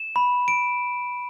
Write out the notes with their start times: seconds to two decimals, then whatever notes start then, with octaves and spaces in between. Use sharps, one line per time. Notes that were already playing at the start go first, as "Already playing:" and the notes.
Already playing: E7
0.16 B5
0.48 D7